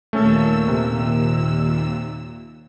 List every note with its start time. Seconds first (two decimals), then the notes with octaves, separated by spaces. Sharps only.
0.13 D#2 A#2 A3 C#4 A4 E6
0.68 C3